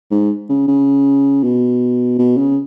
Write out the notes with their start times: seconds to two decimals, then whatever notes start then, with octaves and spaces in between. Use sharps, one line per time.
0.11 G#2
0.49 C#3
0.67 C#3
1.43 B2
2.19 B2
2.37 C#3